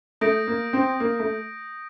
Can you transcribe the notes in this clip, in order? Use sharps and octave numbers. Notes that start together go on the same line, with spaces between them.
A3 D#6 G6 A#6 D7
A#3
C4
A#3
A3